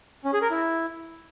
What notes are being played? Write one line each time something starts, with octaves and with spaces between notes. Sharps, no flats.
C#4
G#4
A#4
E4